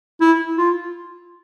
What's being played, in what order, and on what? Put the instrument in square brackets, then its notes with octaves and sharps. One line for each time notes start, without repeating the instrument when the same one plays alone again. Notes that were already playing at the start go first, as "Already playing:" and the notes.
[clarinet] E4
F4